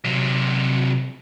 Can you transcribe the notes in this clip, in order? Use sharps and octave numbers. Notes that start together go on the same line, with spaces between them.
C3 F#3